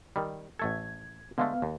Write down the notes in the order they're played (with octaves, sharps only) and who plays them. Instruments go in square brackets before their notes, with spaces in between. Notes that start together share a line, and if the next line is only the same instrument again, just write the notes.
[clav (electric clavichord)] D#3 G3
[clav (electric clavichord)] A1 A3 A4 [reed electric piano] G#6
[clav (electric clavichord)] D3 G#3 A3 [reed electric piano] B3 F5
[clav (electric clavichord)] D#2